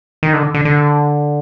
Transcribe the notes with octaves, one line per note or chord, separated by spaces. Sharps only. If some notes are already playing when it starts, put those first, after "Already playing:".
D#3
D3
D3
D3